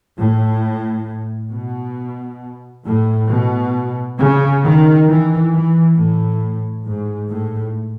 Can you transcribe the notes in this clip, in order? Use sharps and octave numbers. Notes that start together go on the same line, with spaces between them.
A2
B2
A2
B2
C#3
D#3
E3
E3
A2
G#2
A2